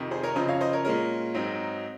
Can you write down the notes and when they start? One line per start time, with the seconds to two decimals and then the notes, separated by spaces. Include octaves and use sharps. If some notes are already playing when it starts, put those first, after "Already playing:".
Already playing: F2 C3 D#3
0.11 G#4 C5
0.23 A#4 C#5
0.36 F#2 C#3 F3 C5 D#5
0.48 C#5 F5
0.61 C5 D#5
0.73 A#4 C#5
0.85 A#2 G#3 C#4 A#4
1.35 G#2 F#3 C4 D#4